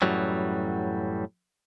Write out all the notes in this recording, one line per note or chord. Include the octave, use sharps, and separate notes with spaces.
F#2 A2 E3 F#3 G3